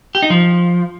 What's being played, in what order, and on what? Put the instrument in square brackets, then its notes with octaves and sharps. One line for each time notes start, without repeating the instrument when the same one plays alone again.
[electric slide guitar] G4
D#4
F3